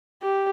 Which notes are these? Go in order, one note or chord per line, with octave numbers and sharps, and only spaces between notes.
G4